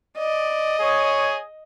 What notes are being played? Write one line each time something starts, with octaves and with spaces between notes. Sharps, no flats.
D5 D#5
G#4 C#5